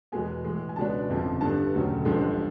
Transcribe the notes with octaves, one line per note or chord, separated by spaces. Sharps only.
E2 B2 G#3 B3 G#5
A2 E3 G#3
G#5
C#2 B2 G#3 B3 D4 A5
G1 F2 C#3 F3
G2 D3 G3 B3 A5
E1 D2 C#3 F#3 A3
A1 G2 D3 F3 G#3